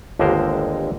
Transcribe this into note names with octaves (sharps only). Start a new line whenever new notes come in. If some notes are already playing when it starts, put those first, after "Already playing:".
G1 D#2 D3 G#3 A#4 C5